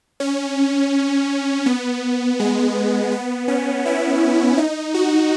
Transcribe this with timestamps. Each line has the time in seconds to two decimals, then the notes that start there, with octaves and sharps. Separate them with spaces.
0.20 C#4
1.66 B3
2.40 G#3
3.12 B3
3.48 C#4
3.86 E4
4.58 D#4
4.94 F#4